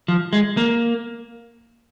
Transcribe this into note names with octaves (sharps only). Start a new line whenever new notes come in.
F3
G#3
A#3